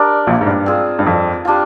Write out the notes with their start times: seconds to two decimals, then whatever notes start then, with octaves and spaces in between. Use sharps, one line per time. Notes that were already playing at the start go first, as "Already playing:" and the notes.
Already playing: D4 G4 A#4 D5
0.27 A#1 A#2
0.41 G#2
0.47 G2
0.66 C4 F4 G#4
0.99 G2
1.06 F2
1.45 G3 D4 F4